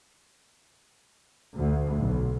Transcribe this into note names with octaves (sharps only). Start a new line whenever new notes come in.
D2
B1